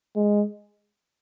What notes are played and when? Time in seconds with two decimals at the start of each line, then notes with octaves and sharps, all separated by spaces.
0.16 G#3